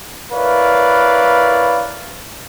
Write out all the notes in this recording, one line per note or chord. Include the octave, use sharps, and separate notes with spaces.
E4 A#4 B4 C#5 D5 F5